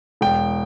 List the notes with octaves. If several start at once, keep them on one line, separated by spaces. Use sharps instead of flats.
E1 G5